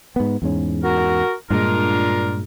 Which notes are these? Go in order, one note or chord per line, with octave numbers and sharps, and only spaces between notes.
G#2 B3
E2 G#2 C#4
F#4 A#4
G2 A#2 G#3 D4 F4 A#4